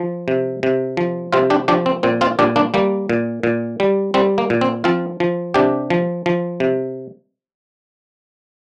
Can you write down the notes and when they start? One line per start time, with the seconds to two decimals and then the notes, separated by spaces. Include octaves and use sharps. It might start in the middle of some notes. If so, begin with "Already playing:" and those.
Already playing: F3
0.28 C3
0.63 C3
0.97 F3
1.33 C3 C4 F4
1.50 D4 G4
1.68 F3 D4 G4
1.86 C4
2.03 A#2 C4
2.21 C4 F4
2.39 A#2 D4 G4
2.56 A#3 D4
2.74 G3 A#3
3.09 A#2
3.43 A#2
3.80 G3
4.14 G3 C4
4.38 A#3
4.50 A#2
4.61 C4
4.84 F3 C4 F4
5.20 F3
5.54 C3 D4 G4
5.90 F3
6.26 F3
6.60 C3